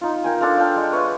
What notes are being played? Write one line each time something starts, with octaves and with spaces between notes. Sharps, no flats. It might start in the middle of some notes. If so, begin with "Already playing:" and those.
D#4 F4
A#4 G5 G#5
D4 A4 C5 F5
D5 F5 G5 A5
G#3
B4 C#5 E5